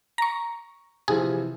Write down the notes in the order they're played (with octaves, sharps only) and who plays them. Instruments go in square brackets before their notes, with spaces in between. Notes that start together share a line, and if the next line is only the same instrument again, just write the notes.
[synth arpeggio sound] A#5 C#6
[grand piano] C3 E3 F3 [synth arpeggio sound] G#4